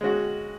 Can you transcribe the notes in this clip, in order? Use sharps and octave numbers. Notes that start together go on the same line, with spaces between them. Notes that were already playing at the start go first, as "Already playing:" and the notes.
G#3 C#4 F#4